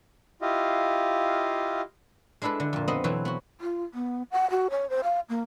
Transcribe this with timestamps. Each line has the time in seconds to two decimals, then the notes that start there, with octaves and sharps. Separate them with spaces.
0.42 E4 F4 G4 D#5 F5
2.42 G#3 D4 E4 A4 B4
2.60 D3
2.73 F2 A#2
2.88 B3 C4 D#5
3.04 B2 E3 F#3 C4
3.25 B3 F#4
3.61 F4
3.94 B3
4.31 F#5
4.50 F#4
4.70 C#5
4.90 C5
5.03 F5
5.29 A#3